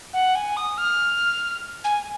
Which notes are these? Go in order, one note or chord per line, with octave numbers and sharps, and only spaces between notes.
F#5
G#5
D#6
F6
G#5